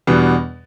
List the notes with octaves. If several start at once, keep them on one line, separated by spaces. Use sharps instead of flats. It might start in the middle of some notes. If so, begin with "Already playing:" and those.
E2 B2 G3 B3 D4